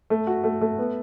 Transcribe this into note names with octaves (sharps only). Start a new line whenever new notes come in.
A3
F#4
A3
A3
B3